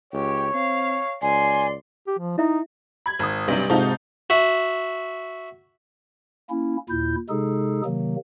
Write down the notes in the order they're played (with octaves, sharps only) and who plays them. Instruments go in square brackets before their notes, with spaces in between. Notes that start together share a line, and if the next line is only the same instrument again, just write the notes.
[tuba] C#2 [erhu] G4 [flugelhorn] C#5
[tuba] C4 [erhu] F5
[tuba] C#2 [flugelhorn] D5 [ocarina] G#5 [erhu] C6
[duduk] G4
F3
[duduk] D#4 [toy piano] E4 E5
[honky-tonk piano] B5 G#6
G#1 D#6
[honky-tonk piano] B1 C3 [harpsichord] G2
[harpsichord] G#2 C3 [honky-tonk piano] D#4 F4 A4
[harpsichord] F#4 E5
[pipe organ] A#3 C#4 E4
D#2 A#2 E4 G6
C3 G#3 D#4 G#4 A4
C3 D#3 F#3 A#3